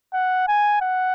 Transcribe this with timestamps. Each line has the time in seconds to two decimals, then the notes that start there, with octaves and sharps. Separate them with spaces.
0.14 F#5
0.48 G#5
0.82 F#5